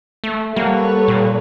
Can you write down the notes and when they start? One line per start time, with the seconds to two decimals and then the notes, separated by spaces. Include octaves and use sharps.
0.24 A3
0.56 G3 A#3 A4 B4 C#5 F#5
1.08 A#2